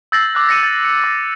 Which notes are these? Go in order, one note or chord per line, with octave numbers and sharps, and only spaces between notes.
E6 G6 A6 A#6 C7 F#7
D6 F#6
A#6 C#7 D#7
A6
C#7
D6 E6